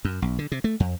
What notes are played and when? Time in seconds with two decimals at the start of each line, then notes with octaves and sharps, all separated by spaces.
0.05 F#2
0.22 B1
0.39 D3
0.52 C3
0.64 A3
0.80 F2